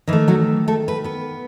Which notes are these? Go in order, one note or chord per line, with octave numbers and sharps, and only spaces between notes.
D#3 E3 E4
A3
F#3 F#4
A3 A4
B4
B3 B4